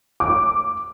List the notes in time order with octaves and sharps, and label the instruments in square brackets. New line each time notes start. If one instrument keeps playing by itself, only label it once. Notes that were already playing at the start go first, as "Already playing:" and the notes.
[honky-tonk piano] D6